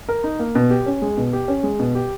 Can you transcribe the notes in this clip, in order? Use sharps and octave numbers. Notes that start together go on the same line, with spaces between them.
A#4
D#4
A#3
B2
G4
C#4
G#3
B2
G4
C#4
G#3
B2
G4